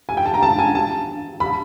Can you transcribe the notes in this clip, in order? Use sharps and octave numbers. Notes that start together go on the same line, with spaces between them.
G#5
G5
A5
A#5
A5
G#5
A5
B5